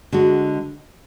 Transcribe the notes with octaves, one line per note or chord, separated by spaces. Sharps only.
D3 G#3 D4 F#4